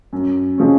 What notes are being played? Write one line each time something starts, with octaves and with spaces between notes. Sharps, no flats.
F#2
C#3 F3 G#3 C#4